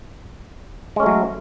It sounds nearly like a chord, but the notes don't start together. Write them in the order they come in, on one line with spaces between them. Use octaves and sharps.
G#3 C#4 A3 F#3